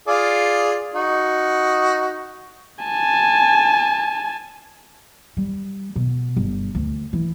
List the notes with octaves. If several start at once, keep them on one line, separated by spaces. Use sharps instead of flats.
F4 G#4 D5
D#4 F#4
G#5 A5
G3
B2
G1
D2
E3